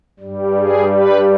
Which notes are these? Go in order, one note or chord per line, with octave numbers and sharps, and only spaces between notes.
G2 G3
G#4
B4